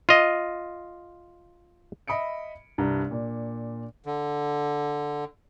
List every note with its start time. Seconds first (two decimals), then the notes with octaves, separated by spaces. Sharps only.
0.09 F4 D#5
2.08 D#5 E5 B5 D#6 C#7 D7
2.78 C2 G2 A#5
3.11 A#2 D4
4.06 D3